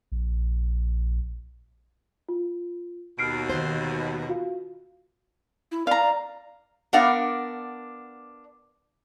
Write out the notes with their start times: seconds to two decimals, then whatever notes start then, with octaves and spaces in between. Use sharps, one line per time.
0.12 A#1
2.29 F4
3.19 D#2 B2 F6 C7 D7
3.50 D#3 C5
4.28 F4 F#4 F5
5.72 E4
5.87 D5 F5 A#5
6.93 B3 D4 A#4 D5 F5 F#5